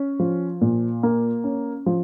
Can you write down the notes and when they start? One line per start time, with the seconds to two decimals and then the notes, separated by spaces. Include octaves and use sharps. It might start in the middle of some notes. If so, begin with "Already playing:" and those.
Already playing: C#4
0.20 F3
0.61 A#2
1.03 A#3
1.44 C#4
1.86 F3